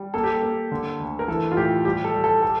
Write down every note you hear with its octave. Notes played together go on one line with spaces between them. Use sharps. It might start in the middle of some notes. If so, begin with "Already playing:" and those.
Already playing: G3
A#3 A4
G4
A4
A#3
D3
D2
A#4
E3 A4
F4
A2 G4
G3 G4
A4
G3
A4
A4